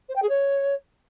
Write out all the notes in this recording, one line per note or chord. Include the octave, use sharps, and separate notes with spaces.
C5
G5
G#4
C#5